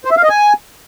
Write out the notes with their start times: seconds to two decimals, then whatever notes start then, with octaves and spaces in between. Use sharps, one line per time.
0.05 C5
0.11 E5
0.17 F5
0.23 D#5
0.29 G#5